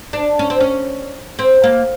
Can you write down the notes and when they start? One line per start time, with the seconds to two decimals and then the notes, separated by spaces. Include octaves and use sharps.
0.13 D4
0.39 C#4
0.50 C4
0.60 C#4
1.39 C4
1.64 A#3